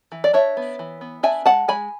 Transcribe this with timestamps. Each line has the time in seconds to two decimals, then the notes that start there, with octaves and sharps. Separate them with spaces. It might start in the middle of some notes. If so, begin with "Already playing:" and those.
0.12 E3
0.24 D5
0.33 D4 C#5 E5
0.57 B3
0.79 E3
1.01 B3
1.23 D4 E5 G#5
1.45 G#3 F#5 A5
1.68 G#3 G#5 B5